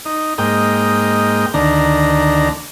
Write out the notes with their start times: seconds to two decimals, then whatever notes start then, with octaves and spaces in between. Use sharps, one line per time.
0.05 D#4
0.38 G#2 A#3 D#5 G5
1.54 D2 D#3 D4 A#5